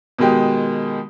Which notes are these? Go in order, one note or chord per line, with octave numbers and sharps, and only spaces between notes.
B2 D#3 G#3 G4